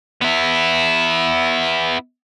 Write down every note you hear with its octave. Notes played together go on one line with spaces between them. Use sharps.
B3 E4